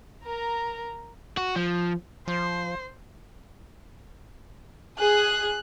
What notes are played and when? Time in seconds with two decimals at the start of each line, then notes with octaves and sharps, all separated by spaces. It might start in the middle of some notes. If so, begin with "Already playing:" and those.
0.25 A#4 A#5
1.37 F#4
1.56 F3
2.28 F3 C5
4.99 G#4 F#6